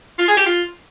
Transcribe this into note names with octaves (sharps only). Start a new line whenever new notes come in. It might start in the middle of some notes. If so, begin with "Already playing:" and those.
F4
G#4
G4
F4